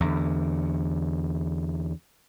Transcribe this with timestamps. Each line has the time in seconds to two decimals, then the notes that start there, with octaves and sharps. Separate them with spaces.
0.01 E2 D3